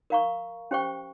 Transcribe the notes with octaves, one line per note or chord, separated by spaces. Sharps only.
A#4 F5 A#5 C#6
C#4 G4 C5 G5 C#6